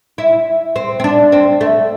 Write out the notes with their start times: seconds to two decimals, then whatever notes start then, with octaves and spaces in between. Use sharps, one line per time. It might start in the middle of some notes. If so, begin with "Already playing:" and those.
0.18 E4
0.76 C4
1.00 C4
1.04 D4
1.32 C4
1.61 A3